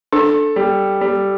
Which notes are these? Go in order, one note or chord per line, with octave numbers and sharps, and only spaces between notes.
D4 A4
G3
G3